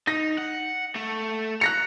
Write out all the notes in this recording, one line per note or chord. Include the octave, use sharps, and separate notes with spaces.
D#4 A#6
F#5
A3 A4
A#5 F#6 A#6 C#7